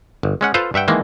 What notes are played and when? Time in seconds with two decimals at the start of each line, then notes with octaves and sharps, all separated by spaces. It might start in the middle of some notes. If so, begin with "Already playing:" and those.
0.23 G1
0.41 G#3 C#4 F#5
0.54 F4 A4 B4 C5 F5
0.74 G2 E5 F#5 G5
0.88 D#3 E3 G#3 A#3